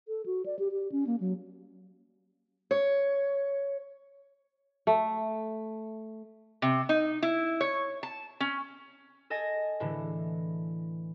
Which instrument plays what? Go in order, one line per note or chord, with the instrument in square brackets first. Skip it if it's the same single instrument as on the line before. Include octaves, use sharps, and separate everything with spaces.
[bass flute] A4
F#4
D5
G4
G4
C#4
A#3
F#3
[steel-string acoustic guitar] C#5
[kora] A3
[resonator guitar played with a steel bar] C3
D#4
E4
C#5
A5
C#4
[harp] A4 D#5 G#5 A#6
A2 D3 E3